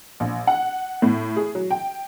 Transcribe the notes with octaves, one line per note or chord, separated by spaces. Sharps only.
A#1
F#5
A2
G#4
F#3
G5